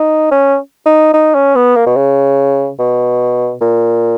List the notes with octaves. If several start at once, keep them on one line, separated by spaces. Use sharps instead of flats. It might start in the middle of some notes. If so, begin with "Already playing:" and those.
Already playing: D#4
C#4
D#4
D#4
C#4
B3
A#3
B2
C#3
B2
A#2